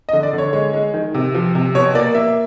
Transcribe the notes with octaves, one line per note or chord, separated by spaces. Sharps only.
D#5
D3
D5
D3
C#5
G#3 C#5
G#3
D#3
C3
F3
C3
B2 C#5
A#3 D5
A#3 E5